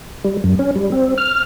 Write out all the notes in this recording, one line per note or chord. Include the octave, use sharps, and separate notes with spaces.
G3
F#2
C#4
G3
C4
F6